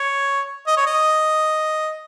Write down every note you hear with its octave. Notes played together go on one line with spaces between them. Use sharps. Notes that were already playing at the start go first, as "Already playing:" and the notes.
Already playing: C#5
D#5
C#5
D#5